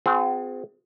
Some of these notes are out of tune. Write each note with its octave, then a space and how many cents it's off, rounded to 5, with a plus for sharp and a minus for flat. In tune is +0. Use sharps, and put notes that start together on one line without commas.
C4 -35 F4 +40 G#4 +0